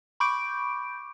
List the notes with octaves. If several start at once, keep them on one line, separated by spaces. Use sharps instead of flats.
B5 C#6 D6 G6 D7